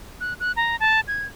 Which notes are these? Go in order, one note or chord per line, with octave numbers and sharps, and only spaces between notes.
F#6
F#6
A#5
A5
G#6